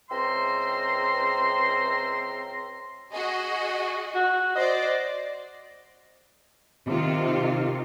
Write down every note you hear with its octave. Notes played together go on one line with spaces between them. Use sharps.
C#2 C4 E5 A#5 C6
F#4 G#4 D#5
F#4
C5 D5 D#5
C3 D#3 F4